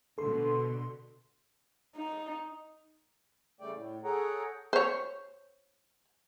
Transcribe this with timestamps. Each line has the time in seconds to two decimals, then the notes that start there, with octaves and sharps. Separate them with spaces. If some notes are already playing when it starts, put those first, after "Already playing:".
0.18 B2 D3 A4 C6
1.96 D#4
3.61 C#3 G3 A3 D5 G5
3.73 A2
4.04 G#4 A4 C#5 F#5 G5 A#5
4.73 C5 C#5